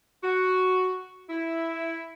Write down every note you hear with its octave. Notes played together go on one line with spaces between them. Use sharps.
F#4
E4